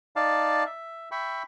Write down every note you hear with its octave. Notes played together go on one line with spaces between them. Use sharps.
D#4 D5 F5 A5
E5
E5 G5 B5 C#6